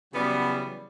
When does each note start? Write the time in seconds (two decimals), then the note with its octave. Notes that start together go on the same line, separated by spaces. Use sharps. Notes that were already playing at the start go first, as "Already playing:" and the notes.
0.14 C#3 E3 F#3 G3 B3